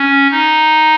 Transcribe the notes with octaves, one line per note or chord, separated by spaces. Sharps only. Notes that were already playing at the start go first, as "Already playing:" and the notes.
Already playing: C#4
D#4